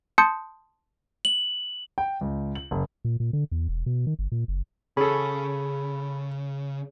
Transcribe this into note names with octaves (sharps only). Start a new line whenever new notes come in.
A5 C6 D#6 G6 C#7
F#7
G5
C#2
F#7
F#1
A#2
A#2
D3
E2
E1
B2
D#3
G1
A#2
F#1
C#3 C#4 G#4 A4 B5